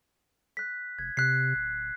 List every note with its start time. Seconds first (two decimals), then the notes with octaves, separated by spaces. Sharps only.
0.57 F#6 B6
0.99 F1 G#6
1.17 C3 F#6 B6 C7
1.55 D1